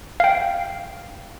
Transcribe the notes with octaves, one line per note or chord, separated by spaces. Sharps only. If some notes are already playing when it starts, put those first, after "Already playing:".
F5 G5